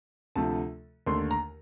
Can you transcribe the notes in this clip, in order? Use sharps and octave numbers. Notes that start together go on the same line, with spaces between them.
D2 C3 F3 A3 A5
D#2 D3 A3 C6
A#5